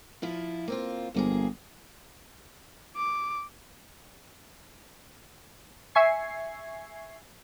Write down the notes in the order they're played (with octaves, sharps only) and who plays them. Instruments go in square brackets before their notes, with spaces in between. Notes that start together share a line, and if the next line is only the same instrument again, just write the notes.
[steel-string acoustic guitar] F3 E4 F4
A#3 C4 F4
[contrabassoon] G1 [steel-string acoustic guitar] F2 A#3 G#4
[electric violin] D6
[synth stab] E5 G#5 C#6 G#6 C7